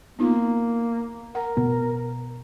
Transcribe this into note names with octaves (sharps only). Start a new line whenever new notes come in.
A#3 B3 D#4 F4
A#4 F#5
B2 B3